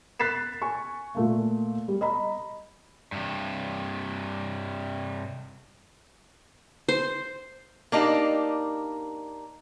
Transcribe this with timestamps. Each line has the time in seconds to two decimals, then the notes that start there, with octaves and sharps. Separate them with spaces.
0.19 F#6 A6 B6 C7 E7
0.62 G#5 C#6
1.15 A#2 A3 A#3
1.88 G3
2.01 D#5 A#5 B5
3.12 G2 C3
6.89 C5
7.92 A#3 D4 D#4 G4